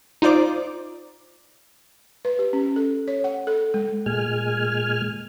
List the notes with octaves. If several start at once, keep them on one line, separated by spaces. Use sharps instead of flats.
D#4 F4 C5 D5 D6
B4
G4
C#4
A4
C#5
F#5
A4
G#3
A#2 G#3 G#5 F6